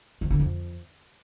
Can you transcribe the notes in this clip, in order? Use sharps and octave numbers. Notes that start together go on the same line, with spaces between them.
D#3
D3
F2